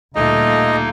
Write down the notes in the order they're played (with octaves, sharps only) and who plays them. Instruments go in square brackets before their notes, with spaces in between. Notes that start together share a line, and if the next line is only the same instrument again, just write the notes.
[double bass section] D2 A#2 G3 [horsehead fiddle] A3 F4 [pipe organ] A#3 D#4 [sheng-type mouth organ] D#5